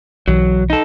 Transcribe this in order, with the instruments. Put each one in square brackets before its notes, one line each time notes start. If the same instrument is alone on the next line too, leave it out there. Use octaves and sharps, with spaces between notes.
[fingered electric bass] B1 E3 [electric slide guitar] F#3
[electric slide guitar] D#4 A4